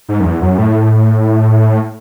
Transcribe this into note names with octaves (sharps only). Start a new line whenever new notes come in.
G#2
F#2
E2
F#2
A2